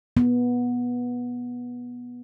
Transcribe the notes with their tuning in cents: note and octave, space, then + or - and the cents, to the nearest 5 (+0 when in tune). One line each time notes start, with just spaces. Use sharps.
B3 -15